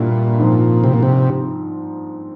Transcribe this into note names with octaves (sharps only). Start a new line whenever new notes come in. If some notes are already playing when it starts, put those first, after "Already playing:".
Already playing: G2 A#2 G3 A#3 E4
G#2 F3 C4
C3
A#2
C3